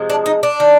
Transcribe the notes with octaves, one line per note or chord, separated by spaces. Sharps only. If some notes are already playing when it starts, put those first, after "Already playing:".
Already playing: C3 F3 G#3
D4
D#4
D4
D#3